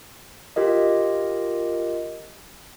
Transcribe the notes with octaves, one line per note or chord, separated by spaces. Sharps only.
F4 G4 A#4 D#5